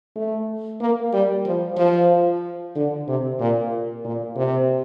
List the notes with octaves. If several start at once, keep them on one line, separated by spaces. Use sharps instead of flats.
A3
A#3
G3
F3
F3
D3
C3
A#2
A#2
C3